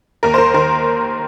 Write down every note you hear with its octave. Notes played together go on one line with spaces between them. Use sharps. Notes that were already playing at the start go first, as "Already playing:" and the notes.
D#2 A#4
C5
A#4
D#3 A#4